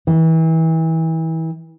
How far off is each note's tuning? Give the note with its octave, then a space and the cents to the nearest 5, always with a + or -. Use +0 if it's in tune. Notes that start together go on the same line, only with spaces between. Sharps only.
E3 -30